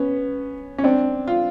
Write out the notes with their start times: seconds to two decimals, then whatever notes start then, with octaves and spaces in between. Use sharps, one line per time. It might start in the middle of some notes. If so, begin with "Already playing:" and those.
Already playing: B3 C#4
0.78 C#4
0.84 C4 D4
1.28 F4